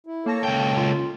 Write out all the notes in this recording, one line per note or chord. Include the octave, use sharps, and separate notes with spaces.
E4
A#3 A4 C#5 A5 A#6
C#2 G5
F4